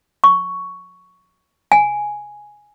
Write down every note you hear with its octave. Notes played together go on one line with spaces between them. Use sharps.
C#6
G#5